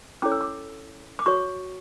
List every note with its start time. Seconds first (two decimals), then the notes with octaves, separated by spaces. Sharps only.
0.22 C#4 E4 A4 C#5 D6
0.32 E6
0.41 D6
1.19 D6
1.26 F#4 C#5 C#6